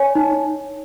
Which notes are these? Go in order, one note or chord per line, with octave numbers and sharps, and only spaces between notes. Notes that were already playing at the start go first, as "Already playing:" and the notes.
Already playing: C#5 G#5
D#4